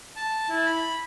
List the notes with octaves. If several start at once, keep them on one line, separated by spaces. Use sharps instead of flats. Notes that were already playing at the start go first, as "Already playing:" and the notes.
A5
E4
B5